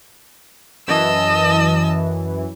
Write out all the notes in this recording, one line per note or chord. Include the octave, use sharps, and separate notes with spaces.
F#2 E3 D#5 A5 E6